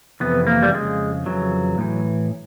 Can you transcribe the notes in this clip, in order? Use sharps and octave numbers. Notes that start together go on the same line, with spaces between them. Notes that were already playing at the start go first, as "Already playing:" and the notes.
F2 C3 E3 B3
A#3
G3
F2 C#3 G#3
F2 C#3 E3 F#3
A2 E3